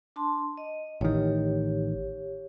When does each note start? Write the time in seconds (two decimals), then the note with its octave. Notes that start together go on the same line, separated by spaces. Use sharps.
0.16 D4 A5 C6
0.57 D#5
1.01 A1 D#3 G4 C#5